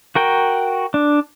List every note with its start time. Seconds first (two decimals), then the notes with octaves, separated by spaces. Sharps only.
0.15 F#4 A#4 G5
0.94 D4